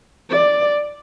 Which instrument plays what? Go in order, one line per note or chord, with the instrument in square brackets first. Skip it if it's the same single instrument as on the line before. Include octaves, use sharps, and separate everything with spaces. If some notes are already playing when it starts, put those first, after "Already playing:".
[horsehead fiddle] D5